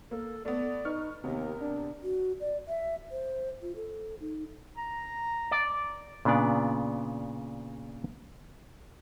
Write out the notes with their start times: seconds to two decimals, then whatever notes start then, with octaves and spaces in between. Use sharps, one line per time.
0.11 A#3 A4
0.45 A3 B3 D5
0.85 D#4 B4 C#6 F6
1.24 D#2 C3 B3 A#4
1.61 D4
2.03 F#4
2.40 D5
2.68 E5
3.11 C5
3.62 F4
3.76 A4
4.20 D#4
4.77 A#5
5.51 D5
6.25 A#2 C#3 B3 D4 D5